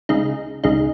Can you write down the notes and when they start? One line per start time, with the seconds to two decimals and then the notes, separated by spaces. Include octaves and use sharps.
0.09 C#2 C#3 G#3 D#4
0.64 C#2 C#3 G#3 D#4